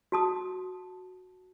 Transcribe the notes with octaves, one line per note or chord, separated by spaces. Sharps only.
F#4 A5 D#6